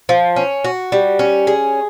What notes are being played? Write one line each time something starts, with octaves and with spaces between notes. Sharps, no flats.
F3
C#4
F#4
G3
C#4
G#4